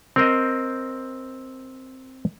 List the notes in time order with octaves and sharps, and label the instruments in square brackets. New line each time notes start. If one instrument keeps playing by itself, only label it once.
[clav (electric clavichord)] C4 A#4 C5 D#5